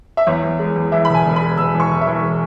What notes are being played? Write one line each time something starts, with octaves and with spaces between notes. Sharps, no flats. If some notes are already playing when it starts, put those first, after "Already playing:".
E5
E2 C#5
E2
G#3
E2
E3 E5
B5
E1
G#5
E1
B5
G#3
E1 E6
E3
C#6
E1
E5
E3
G#3